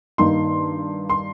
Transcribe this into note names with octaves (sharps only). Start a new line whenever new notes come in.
G2 D#3 A#3 D#4 C6
C6